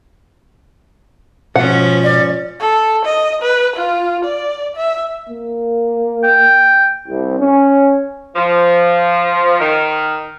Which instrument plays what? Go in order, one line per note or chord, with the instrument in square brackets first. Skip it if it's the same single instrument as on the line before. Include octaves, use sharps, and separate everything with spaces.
[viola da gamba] G#2 F3 C#4 [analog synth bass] B2 [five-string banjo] F#5
[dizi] D5
[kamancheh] A4
D#5
B4
F4
D5
E5
[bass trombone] A#3
[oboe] G5
[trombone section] C2
C#4
[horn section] F3
D#3